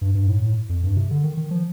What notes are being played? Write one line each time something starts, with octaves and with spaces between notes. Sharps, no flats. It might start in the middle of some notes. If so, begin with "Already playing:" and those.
G2
G2
A2
A2
F2
G2
C3
D3
D#3
D#3
F3